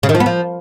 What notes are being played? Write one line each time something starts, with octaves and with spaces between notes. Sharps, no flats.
C#3
D#3
F3
B3
F3